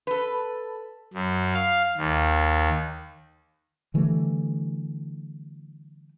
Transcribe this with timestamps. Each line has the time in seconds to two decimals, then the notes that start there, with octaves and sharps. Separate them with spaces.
0.07 A4 B4
1.13 F#2
1.54 F5
1.98 D#2
3.94 D3 E3 G3 A3